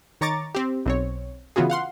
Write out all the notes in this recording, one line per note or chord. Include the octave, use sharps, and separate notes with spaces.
D#3 C#5 A#5 C#6 D6 A6
C4 G4
B1 C4 C#5
C#3 E3 B3 F4 F#4 G#4
F5 F#5 C6